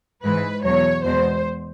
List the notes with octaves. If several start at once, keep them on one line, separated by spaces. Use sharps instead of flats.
G#2 E3 G#3 B4
E2 B2 F#3 C#5
E2 B2 G#3 C5